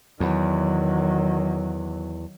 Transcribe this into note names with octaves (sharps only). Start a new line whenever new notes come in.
E2 D#3 F#3